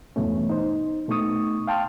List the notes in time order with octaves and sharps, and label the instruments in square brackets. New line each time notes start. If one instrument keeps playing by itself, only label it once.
[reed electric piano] E2 G2 B2 A3 C#4
D#4 C5
B2 A3 D#4 C#6 D#6
F5 G5 A5 C6 F6